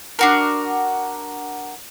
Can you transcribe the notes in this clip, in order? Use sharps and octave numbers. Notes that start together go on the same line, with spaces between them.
D4 F#4 A#4